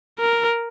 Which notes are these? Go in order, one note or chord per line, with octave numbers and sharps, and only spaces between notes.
A#4